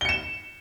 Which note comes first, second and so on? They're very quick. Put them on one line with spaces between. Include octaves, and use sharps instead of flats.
G7 C#7 E7